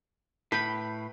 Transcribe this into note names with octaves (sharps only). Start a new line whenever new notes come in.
A2 B4 G5 B5